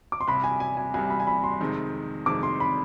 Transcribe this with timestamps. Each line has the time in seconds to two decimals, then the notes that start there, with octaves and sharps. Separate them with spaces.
0.12 D6
0.21 C6
0.28 C2 C3 G3 B5
0.44 G#5
0.60 G#5
0.77 G#5
0.94 C2 C3 G3 G#5
1.10 B5
1.20 G#5
1.27 B5
1.44 C6
1.60 F2 C3 D#3 G#3 C4
2.26 F2 C3 D#3 G#3 C4 D6
2.43 C6
2.60 B5